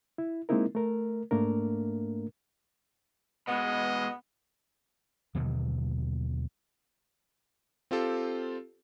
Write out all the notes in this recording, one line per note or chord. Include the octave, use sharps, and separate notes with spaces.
E4
G#3 A#3 C4 D#4 E4 A#4
A3 A#4
G#2 A3 A#3 D4 A#4
B2 G#3 B3 D#5
D#2 B2 D3 F#3
C4 F4 G4 A4